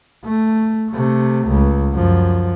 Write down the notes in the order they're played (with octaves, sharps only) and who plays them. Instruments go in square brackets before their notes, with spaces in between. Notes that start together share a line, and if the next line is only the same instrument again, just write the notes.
[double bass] A3
C3 A3
C#2
F#2 F3